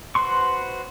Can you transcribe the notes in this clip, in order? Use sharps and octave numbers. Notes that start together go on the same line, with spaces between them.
F#4 B4 C5 C6 C#6